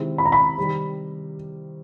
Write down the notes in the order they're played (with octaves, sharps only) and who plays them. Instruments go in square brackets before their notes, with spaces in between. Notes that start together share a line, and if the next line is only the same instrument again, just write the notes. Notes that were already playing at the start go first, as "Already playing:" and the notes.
Already playing: [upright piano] C3 D#3 G#3 C4 E4
[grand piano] B5
A#5
B5
[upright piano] C3 D#3 G3